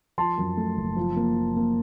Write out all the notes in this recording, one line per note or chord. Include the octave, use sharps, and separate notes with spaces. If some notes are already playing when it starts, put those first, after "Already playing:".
F3 A5 C6
F#2
A3
F#1
F3
A#3
F3
A#3